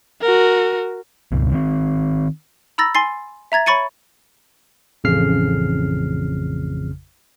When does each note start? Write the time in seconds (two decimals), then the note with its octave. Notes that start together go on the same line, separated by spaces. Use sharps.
0.22 F#4 A#4
1.32 C#2 G2 B2
1.51 D#3 C4
2.78 A#5 B5 E6 A6 A#6
2.95 G#5 C6 A6 C7
3.52 E5 A#5 G#6 A6
3.66 C#5 B5 C#6 A6 C#7 D#7
5.04 A1 F2 C#3 F6 C7